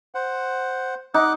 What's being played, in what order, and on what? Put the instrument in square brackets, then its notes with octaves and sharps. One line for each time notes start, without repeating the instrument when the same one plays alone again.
[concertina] C5 F#5
[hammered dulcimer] D#4 [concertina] F#5 D6 F#6